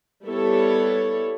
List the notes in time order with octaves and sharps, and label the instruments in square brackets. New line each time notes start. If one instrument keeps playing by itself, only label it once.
[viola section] G3 B3 E4 A4 C#5